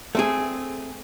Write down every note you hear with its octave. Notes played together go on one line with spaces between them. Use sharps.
A3 C4 G#4